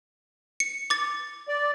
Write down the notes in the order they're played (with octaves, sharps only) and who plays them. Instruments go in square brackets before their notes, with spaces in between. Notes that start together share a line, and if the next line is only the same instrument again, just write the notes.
[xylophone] C#7
D6 A6
[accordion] D5